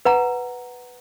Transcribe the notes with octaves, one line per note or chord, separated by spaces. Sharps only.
B4 F#5 A#5